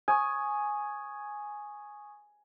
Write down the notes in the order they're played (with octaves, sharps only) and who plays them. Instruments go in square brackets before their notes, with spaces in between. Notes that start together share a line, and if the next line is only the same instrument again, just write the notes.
[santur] G#5 [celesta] C#6 D#6